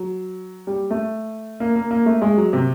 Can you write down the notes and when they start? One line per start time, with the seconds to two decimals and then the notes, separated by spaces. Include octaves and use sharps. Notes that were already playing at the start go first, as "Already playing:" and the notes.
Already playing: F#3
0.67 G3
0.91 A3
1.60 A#3
1.76 A#3
1.91 A#3
2.06 A3
2.22 G#3
2.37 F#3
2.53 C3